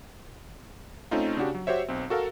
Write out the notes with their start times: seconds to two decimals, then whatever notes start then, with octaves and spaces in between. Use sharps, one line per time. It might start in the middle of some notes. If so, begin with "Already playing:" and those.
1.11 A3 C4 C#4 D#4 F4
1.37 C#3 D4 F#4 G4
1.55 F#3
1.67 F#4 G4 C5 C#5 E5
1.88 B1 C4
2.10 F#4 A4 A#4 F5